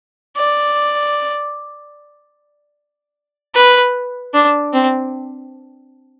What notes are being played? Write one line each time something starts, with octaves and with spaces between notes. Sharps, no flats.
D5
B4
D4
C4